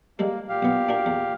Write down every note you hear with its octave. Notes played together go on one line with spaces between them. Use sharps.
G3 G#3 A#3 A4
A#2 G4 F5
B1 B3
D4 F#4 A#4
E2